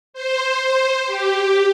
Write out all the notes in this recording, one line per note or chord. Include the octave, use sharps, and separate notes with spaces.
C5
G4